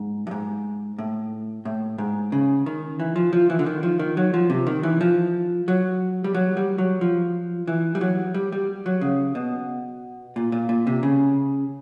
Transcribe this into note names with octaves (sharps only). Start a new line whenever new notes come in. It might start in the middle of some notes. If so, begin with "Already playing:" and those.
Already playing: G#2
G2
G#2
A2
A2
G#2
C#3
D#3
E3
F3
F3
E3
D3
D#3
F3
D#3
F#3
F3
C3
D#3
E3
F3
F#3
G3
F#3
G3
F#3
F3
E3
G3
F#3
G3
G3
F#3
C#3
B2
A#2
A#2
A#2
C3
C#3